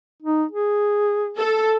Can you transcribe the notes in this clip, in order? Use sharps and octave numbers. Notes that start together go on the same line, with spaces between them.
D#4
G#4
A4